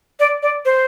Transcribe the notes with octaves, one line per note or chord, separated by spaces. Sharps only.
D5
D5
C5